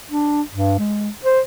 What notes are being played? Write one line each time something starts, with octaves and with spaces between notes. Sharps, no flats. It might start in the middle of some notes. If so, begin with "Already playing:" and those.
D4
G2
G#3
C5